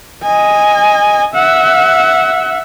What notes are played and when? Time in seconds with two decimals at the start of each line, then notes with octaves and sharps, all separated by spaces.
0.23 D#5 G#5
1.34 E5 F#5